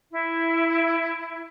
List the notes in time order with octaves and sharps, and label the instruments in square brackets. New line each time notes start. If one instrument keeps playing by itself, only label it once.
[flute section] E4